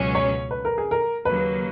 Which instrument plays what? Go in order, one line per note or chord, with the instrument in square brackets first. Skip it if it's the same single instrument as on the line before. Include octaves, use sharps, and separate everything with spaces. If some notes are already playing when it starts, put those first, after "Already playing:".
Already playing: [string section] C#2 B2 F#3 C#4
[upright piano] C#5
B4
A#4
G#4
A#4
[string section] D#2 C#3 F#3 A#3 [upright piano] B4